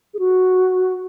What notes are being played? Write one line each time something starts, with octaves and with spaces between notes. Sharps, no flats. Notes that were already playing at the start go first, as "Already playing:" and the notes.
G#4
F#4